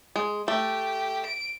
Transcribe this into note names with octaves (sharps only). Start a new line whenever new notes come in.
G#3
A3 G4
D7